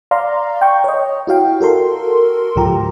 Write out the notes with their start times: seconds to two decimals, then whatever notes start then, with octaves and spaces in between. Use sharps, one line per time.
0.11 D5 F5 A#5 C6
0.61 G5 C#6
0.84 C#5 D#5
1.27 E4 F#4 F5 G5
1.61 F#4 A4 A#4 C6
2.56 C#2 G#2 F3 G4 A#5